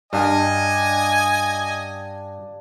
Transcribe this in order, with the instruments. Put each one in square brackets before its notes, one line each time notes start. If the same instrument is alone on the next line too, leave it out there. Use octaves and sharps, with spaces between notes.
[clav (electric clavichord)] G2 [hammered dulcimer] D4 F5 G5 [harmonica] D#5 G#5